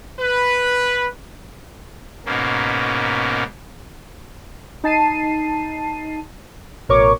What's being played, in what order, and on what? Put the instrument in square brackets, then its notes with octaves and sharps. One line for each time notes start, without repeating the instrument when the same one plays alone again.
[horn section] B4
[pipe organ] G#2 B2 A#3 C#4
[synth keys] D#4 A5 C7 D#7
A1 B2 A#4 C#5 C#6 D6